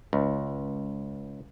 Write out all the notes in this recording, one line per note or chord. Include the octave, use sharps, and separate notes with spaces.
C#2